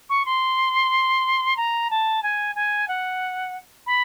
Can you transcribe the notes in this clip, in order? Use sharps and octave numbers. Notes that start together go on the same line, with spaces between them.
C#6
C6
A#5
A5
G#5
G#5
F#5
B5